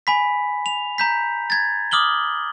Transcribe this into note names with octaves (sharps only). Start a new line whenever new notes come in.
G#5 B5 B6
F7
A#5 G6 B6
G#6 A6
D6 D#6 F6 F#7 G7